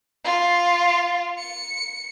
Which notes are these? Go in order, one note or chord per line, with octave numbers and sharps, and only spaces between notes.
F4
C#7